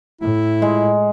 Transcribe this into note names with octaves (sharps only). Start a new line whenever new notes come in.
A2 E4
G#3